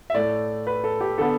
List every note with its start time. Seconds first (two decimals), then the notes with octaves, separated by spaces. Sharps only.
0.10 E5
0.14 A2 A3 D5
0.67 B4
0.84 A4
1.01 G4
1.18 D3 B3 A4